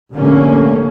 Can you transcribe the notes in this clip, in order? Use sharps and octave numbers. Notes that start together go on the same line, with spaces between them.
F1 A2 D3 A3 A#3 C#4